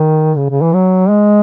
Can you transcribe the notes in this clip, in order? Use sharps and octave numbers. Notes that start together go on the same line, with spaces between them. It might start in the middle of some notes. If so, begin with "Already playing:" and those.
Already playing: D#3
C#3
C#3
E3
F#3
G#3